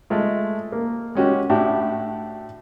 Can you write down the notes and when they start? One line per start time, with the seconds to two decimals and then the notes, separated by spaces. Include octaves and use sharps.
0.10 G#3 A3 F4
0.72 A#3
1.15 G#3 C#4 F#4 G4
1.50 A2 D4 E4 F#4 G4